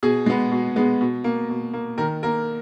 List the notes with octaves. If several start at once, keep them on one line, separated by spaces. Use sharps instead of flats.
B2 G#4
G#3 B3
B2
G#3 B3
B2
A#3
B2
A#3
D#3 A#4
A#3 A#4